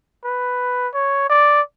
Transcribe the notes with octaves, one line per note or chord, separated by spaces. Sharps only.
B4
C#5
D5